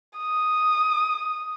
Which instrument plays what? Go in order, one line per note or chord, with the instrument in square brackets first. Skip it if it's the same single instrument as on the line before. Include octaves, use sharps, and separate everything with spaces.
[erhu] D#6